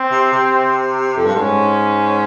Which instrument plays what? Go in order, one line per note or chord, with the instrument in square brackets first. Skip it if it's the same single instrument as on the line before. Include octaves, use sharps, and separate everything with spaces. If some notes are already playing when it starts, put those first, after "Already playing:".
Already playing: [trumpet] C4
[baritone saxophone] C3
C3
F2
G2
[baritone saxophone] G#2 [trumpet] C#4